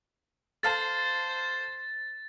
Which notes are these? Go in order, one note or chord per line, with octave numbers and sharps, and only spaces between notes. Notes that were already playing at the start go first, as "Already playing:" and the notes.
A4 C5 F5 A5 A6